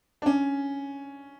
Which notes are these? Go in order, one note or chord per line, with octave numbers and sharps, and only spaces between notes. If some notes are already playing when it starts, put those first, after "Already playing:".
D4
C#4